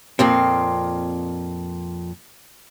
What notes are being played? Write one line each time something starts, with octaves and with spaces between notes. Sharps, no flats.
F2 A#2 C4